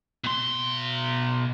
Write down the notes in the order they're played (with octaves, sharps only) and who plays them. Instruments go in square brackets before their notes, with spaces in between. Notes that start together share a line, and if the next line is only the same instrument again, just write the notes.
[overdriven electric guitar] B2 C6